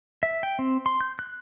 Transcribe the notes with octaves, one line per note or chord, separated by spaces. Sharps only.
E5
G5
C4
C6
G6
F#6